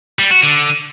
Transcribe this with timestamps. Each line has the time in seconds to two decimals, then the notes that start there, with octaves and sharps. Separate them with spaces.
0.19 G3
0.31 F#4
0.43 D3